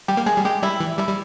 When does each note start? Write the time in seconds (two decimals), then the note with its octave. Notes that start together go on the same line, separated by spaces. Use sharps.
0.08 G3 G4
0.17 A#3
0.26 G#3 G#4
0.37 G3
0.44 G#3 G4
0.62 G3 E4
0.80 E3
0.98 G3 E4
1.09 G3